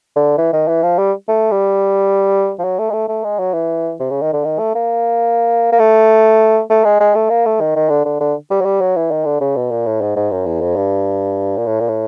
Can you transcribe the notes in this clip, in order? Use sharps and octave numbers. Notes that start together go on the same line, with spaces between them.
D3
E3
D#3
E3
F3
G3
A3
G3
F3
F#3
A3
G#3
A3
A3
G#3
F#3
E3
C3
C#3
D#3
D3
D#3
A3
A#3
A#3
A3
A3
G#3
G#3
A3
A#3
A3
D#3
D#3
D3
D3
D3
G3
F#3
G3
F#3
E3
D#3
D3
C#3
B2
A#2
A2
G#2
G#2
F#2
E2
F2
G2
A#2
A2
A#2
A2